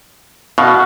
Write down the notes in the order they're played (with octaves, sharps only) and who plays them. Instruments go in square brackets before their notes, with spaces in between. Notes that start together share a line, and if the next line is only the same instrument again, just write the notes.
[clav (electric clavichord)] B2 [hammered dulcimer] F#4 F5